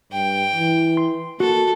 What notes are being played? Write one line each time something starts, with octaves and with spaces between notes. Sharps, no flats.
G2 G5
E3
C6
A#3 F#4 A4